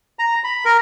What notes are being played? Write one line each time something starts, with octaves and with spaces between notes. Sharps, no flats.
A#5
B5
A#4